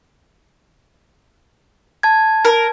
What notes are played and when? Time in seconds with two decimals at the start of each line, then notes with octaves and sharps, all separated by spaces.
2.03 A5 G#6
2.45 A#4